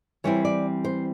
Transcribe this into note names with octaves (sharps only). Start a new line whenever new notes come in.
E3 G3 C4 E4 C#5
D5
C5